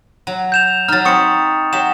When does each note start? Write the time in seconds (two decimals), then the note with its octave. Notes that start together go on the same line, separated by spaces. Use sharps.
0.27 F#3
0.52 G6 E7 F7
0.88 F#3 D#4 F6 A6
1.05 C4 B5 C#6 D#6 C#7
1.73 F#3 G4 E7